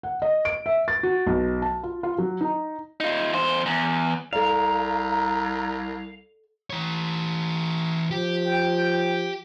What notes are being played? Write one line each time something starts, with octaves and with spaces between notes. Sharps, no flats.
F#5
D#5
D7
E5
A6
F#4
B1
A5
F4
F4
F#3
D#4
D#4 F4
E2 C5
E2
C2 A4 D5 F5 A#5
E3 C#5
F3 G4
G5